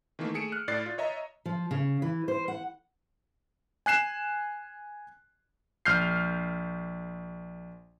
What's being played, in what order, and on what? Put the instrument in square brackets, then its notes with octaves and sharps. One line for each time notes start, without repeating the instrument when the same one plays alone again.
[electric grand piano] D#3 E3 A3 A#3
A3 G#4 C#7 D7 E7
F6 F#6
A2 D5 A6 C7
F4
C#5 D#5 E5 A#5
[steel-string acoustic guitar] F3
C#3
E3
C5
F#5
[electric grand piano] G#5 F#6 C7 E7
A#1 F6 G6 C7